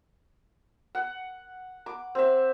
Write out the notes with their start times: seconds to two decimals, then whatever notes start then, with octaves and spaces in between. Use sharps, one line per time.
0.95 F#5
1.86 D6
2.15 C4 E5